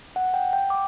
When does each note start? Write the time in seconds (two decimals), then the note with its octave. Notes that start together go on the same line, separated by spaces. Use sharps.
0.16 F#5
0.34 G5
0.53 G5
0.70 D6